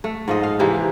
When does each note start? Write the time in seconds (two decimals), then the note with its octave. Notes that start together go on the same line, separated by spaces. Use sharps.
0.04 A3
0.28 G#2 F3 D#5
0.43 F5
0.59 C3 E3 A#3 G4